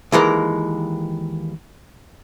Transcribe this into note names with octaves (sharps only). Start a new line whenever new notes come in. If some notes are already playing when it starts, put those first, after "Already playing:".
D#2 E3 G#3 A#4